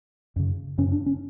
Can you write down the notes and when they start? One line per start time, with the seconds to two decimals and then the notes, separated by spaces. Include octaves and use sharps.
0.36 F#2 C#3
0.78 F#2 C#3 C#4
0.92 D4
1.06 C#4